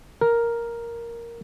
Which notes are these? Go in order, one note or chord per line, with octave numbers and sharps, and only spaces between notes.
A#4